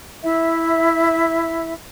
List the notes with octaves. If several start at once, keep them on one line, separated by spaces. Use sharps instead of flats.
E4 E5